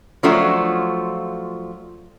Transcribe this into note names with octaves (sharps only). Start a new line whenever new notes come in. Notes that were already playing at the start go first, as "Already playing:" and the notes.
F3 F#3 A3 D4 F4 F#4